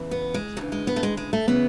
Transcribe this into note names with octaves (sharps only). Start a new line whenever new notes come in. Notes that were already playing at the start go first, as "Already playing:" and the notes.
Already playing: E2 C#3 E3
B3
G#3
D2 C#3 E3 F#3
G#3
B3
A3
G#3
G#3
A3
C#3 E3 B3